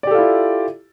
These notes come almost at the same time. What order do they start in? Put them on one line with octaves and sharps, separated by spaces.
D5 G4 A4 F4 E4